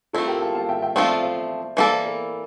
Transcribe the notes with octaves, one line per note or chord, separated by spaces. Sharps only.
A3 C4 E4 F4 A4
G4 A#4
F5 A5
F5 A5
E5 G5
E5 G5
F3 A3 C4 F4 A4 D5 F5
C5 E5
C5 E5
E3 A#3 E4 A4 D5
C5
A#4 D5